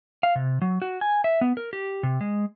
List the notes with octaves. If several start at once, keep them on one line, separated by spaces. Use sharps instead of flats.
F5
C3
F#3
F#4
G#5
E5
B3
A#4
G4
C3
G#3